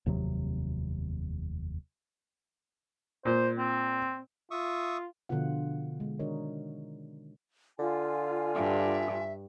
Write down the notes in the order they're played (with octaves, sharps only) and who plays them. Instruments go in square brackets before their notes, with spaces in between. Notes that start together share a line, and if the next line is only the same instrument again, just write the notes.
[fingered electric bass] F1 D#2 C3 F#3
[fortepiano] A#2 [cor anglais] C5
[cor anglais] C4
[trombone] F4 [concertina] E5 C#6 D#6
[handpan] B2 D3 F3 B3 F4 F#5
G#3
D#3 D4 F#4 A#4 C#5 D#5
[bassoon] D3 [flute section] F4 G#5
[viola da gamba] G2 [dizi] E5